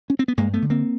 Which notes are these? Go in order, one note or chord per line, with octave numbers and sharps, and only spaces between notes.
C#4
C4
B3
G2 G#3 A#3
A3 B3
D3
A#3 C4